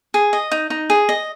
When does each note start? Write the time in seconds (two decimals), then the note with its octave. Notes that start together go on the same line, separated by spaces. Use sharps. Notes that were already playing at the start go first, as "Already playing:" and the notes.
0.14 G#4
0.33 D#5
0.52 D#4
0.70 D#4
0.90 G#4
1.09 D#5